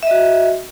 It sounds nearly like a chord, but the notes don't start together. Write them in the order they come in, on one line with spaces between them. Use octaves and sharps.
E5 D#5 F#4